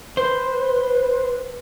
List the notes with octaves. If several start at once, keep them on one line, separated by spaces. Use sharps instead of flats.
B4 C5